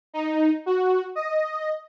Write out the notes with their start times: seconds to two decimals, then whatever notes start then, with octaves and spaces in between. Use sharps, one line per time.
0.14 D#4
0.66 F#4
1.15 D#5